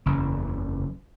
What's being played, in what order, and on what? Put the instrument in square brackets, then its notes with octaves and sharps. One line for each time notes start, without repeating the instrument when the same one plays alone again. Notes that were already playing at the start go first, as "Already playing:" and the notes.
[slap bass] F#1 E2 [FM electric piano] C#3